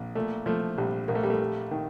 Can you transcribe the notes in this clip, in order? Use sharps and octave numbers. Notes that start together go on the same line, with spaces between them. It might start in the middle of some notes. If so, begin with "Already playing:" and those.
Already playing: A#1
A#2 A3
F3 A3
A#1 G3
A#1 A#3
A3
G3
A3
G3
D#3